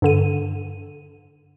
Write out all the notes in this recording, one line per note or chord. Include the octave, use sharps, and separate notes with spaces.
G2 D3 D#7